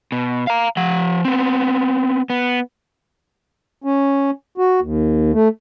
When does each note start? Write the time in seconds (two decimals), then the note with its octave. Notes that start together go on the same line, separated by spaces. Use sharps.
0.12 B2
0.47 F5 A#5
0.77 F3 F#5
1.25 B3 C4
2.30 B3
3.84 C#4
4.58 F#4
4.81 D#2
5.33 A3